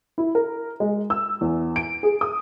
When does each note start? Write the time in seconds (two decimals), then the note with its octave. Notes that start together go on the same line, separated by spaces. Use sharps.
0.18 E4
0.35 A#4
0.80 G#3
1.10 E6
1.41 E2
1.76 D7
2.03 G#4
2.21 D#6